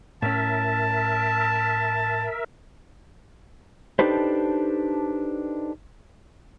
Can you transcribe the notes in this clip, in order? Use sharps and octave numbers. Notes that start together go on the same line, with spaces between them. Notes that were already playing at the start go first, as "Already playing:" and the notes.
A2 C#4 A#4 E5 A5
D4 D#4 G4 A4 B4 C5